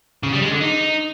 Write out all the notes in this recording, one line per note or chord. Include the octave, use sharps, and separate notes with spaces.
C#3
G3
G#3
D3
D#4